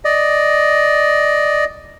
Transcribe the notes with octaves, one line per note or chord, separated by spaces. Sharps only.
D5 D#5